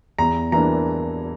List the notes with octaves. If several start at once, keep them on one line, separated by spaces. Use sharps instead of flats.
E2 A#5
E3 A#3 D4 A#5